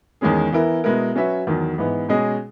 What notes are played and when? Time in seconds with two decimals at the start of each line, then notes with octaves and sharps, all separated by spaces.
0.21 E2 D#3 G#3 C#4 G#4
0.52 E3 B3 E4 A#4
0.84 B2 G#3 B3 E4 A#4
1.15 F#3 C#4 F#4 B4 E5
1.47 E2 D#3 F#3
1.78 G#2 E3 B3
2.09 B2 G#3 C#4 G#4 D#5